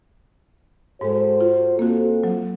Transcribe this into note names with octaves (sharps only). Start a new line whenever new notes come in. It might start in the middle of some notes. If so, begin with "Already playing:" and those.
G#2 G#3 F#4 A4 C5
F4
A#3 C4 F4 F#4 A4
F#3